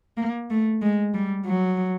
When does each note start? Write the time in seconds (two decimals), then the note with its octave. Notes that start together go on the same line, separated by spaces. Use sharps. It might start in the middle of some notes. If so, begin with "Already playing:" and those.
0.17 A#3
0.50 A3
0.82 G#3
1.14 G3
1.45 F#3